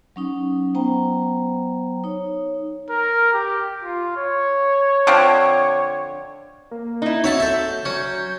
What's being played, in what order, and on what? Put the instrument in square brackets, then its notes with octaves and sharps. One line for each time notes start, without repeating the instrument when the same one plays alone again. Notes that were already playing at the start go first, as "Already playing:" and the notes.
[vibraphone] F#3 C#4 D#4
F#3 B3 C5 G5 A#5
D#4 C#5
[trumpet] A#4
G4
[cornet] F4
C#5
[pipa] D3 F3 C4
[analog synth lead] A#3
[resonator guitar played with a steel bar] D#4 E4
[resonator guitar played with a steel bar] C4 F#4 [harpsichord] C#5 E5 A5
[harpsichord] A4 E5 [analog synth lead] G6
[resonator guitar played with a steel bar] F#3 [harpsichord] C#4